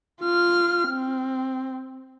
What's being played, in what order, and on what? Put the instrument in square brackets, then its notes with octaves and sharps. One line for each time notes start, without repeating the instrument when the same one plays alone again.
[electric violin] F4 F6
C4